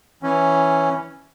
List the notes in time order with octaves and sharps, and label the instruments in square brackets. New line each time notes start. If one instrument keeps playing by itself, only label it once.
[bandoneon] E3 C#4